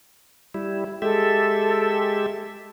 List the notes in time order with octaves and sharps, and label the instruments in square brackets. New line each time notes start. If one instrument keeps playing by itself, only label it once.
[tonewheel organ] G3 E4
[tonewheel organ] G#3 G4 E5 [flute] A4